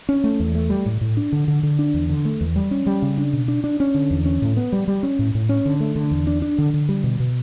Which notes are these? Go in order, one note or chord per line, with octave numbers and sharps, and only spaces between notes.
C#4
A3
E2
A3
G3
A2
A2
D4
D3
D3
D3
D4
E2
D3
A3
E2
G3
C#4
G3
C#3
D4
B2
D4
D4
C#4
D3
E2
C#4
A2
B3
G3
G3
C#4
A2
A2
C#4
D3
A3
D3
E2
D4
D4
D3
D3
G3
B2
B2